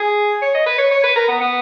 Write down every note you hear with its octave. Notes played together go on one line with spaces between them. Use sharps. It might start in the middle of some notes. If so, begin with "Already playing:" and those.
Already playing: G#4
C#5
D#5
B4
C#5
C#5
B4
A#4
B3
B3